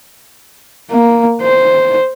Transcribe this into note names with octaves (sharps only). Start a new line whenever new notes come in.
A#3
C5